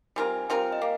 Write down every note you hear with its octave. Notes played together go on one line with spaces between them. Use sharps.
G3 C4 F4 A#4 G#5
G3 C4 F4 A#4 G5
D#5
A#3 F5